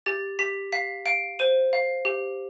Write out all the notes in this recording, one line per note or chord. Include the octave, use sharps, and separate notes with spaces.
G4 A6
G4 B6
F5 B6
F5 D7
C5 D#7
F5
G4